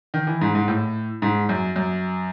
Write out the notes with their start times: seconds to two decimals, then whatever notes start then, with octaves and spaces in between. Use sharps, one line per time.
0.14 D#3
0.27 E3
0.41 G#2
0.55 G#2
0.68 A2
1.22 G#2
1.49 F#2
1.76 F#2